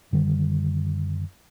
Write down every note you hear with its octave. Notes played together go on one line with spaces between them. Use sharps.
F#2 D3 D#3 G3